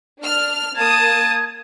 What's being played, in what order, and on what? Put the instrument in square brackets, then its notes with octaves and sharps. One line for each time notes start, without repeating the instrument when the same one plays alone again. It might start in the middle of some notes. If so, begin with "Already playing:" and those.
[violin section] D4 F6
[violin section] A#3 D#6 [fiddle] A5 [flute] G#6